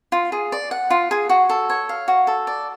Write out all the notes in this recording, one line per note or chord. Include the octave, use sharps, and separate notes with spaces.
F4
G#4
D5
F#5
F4
G#4
F#4
A4
C#5
F5
F#4
A4
D5